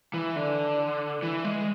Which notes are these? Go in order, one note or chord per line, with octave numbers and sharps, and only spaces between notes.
E3
D3
E3
G#3